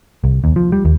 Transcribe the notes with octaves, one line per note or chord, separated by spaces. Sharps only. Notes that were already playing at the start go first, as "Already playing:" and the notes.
C2
D#2
F3
G3
D#2